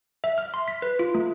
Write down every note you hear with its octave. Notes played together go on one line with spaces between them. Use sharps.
E5
F6
C6
B6
B4
F4
A3